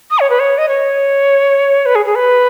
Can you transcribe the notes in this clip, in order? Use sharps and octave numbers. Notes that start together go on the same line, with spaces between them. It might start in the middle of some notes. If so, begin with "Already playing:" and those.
D#6
C#5
B4
C#5
D#5
C#5
B4
G#4
G#4
B4